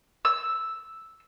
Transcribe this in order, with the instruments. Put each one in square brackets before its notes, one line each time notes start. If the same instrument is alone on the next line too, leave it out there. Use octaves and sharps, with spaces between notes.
[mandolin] E6